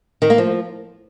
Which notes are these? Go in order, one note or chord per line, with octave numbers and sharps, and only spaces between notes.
D#3
A#3
F3